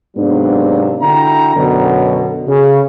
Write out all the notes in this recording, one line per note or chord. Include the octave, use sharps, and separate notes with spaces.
G#2 C3 F#3 A#3 B3 D4
D3 E4 F#4 G5 A#5
F#2 B2 D3 F#3
C#3